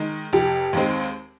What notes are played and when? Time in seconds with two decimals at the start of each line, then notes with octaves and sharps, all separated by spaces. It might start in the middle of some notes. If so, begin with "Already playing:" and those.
Already playing: D#3 G#3
0.33 F1 G4
0.73 D#2 D#3 G#3 C4